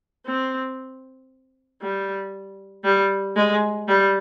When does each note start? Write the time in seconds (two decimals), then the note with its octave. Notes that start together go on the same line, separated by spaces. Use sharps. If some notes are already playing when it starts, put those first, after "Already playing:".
0.26 C4
1.82 G3
2.84 G3
3.36 G#3
3.88 G3